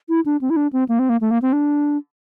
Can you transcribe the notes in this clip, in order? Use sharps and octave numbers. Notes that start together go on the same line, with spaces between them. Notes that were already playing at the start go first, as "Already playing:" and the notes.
E4
D4
C4
E4
D4
C4
A#3
C4
A#3
A3
A#3
C4
D4